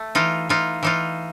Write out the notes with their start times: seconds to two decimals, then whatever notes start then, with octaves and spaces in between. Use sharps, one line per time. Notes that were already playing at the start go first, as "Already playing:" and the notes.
Already playing: A3
0.15 E3 D#4 F4
0.49 E3 D#4 F4
0.83 E3 D#4 F4